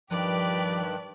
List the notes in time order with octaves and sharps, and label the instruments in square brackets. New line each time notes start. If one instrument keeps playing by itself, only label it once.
[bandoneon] G2 D#3 F#6 [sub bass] F3 [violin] G4 B4 [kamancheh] D5